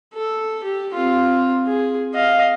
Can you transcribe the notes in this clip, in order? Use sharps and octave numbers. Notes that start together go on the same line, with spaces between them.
A4
G4
C4 F4
G#4
D#5 F5